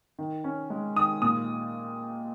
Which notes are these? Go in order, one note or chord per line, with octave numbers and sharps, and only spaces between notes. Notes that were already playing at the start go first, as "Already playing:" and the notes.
D#3
C#4
G#3
D#3 D#6
A#2 D#6